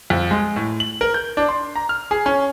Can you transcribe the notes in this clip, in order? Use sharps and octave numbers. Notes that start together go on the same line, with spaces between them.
F2
G#3
A2
F#7
A#4
G6
D4
C6
A#5
F6
G#4
C#4